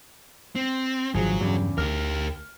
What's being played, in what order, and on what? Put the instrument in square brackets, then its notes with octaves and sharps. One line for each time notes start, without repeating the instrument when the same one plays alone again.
[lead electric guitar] C4
[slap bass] G#1 D3 [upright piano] F3 G#4 [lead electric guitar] F#3
[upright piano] E2 C#3 [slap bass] G2
[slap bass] D2 [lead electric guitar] G4 A#4 [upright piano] F6